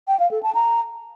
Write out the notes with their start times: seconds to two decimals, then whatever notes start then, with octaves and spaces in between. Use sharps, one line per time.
0.08 G5
0.20 F5
0.31 A4
0.43 A5
0.55 A#5